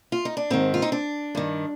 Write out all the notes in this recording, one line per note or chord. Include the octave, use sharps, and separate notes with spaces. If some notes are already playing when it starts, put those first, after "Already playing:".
F4
D#4
D4
G#2 D#3 C4
F4
D#4
D4
G2 D#3